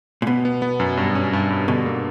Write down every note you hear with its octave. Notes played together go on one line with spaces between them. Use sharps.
A#2
B2 B3
B3
B3
F#2
G2
C#4
G2
G2
B2 D3
A#3